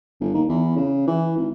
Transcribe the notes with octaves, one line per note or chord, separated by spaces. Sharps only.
G1
D#2
E2
C#3
E3
G#1